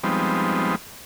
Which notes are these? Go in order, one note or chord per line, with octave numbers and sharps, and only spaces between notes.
F3 G3 G#3 B3 C4 D#4